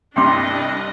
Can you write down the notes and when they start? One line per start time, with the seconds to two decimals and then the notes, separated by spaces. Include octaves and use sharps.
0.16 C2 G2 D4 D#5 G5 C6 D6